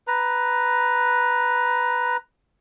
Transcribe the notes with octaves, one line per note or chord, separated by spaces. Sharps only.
B4 A#5